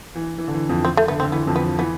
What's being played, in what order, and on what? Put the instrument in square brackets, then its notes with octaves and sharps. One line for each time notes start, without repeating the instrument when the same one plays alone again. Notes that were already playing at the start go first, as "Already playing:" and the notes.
[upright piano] E3
E3
D3
E3
F2 F3
[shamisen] C4
A3
[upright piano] D3 [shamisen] B3
[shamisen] C4
[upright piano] D3
[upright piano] E3 [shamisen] B3
[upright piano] F2 F3
[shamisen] B3
[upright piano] F3
[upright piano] E3 [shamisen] B3